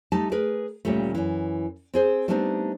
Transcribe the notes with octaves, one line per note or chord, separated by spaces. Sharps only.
G3 A3 D#4 A5
G#4 A#4 B4
D2 A#2 C#3 G3 A3
F#2 E3
C4 G#4 C5
G3 A3 B3 C4 D4 D#4